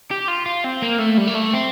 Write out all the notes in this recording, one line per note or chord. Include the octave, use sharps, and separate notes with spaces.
G4
F4
F4
C4
A#3
A3
G3
A#3
A3
C4